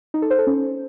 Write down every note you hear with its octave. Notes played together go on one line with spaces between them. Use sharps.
D#4
A4
C5
A4
C#4